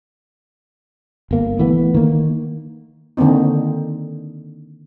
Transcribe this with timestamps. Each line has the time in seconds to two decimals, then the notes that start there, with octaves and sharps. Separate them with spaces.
1.31 G1 A#3
1.59 E3 A3 B3
1.95 D#3 A#3
3.17 D3 D#3 A#3 C4 D#4